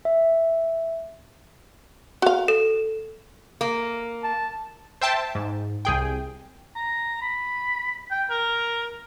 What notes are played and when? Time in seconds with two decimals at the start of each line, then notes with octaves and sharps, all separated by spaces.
0.05 E5
2.22 F#4 F5
2.48 A4
3.61 A#3
4.24 A5
5.01 C5 E5 G5 A5
5.35 G#2
5.85 C2 G#4 G5
6.76 A#5
7.22 B5
8.11 G5
8.30 A#4